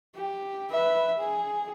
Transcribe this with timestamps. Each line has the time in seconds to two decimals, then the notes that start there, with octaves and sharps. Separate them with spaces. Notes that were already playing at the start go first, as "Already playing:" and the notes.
0.15 G4
0.70 B4 E5
1.18 G#4